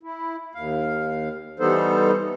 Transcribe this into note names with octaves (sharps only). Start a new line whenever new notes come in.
E4
D#2 F5
E3 G3 B3 D#4 A4 C5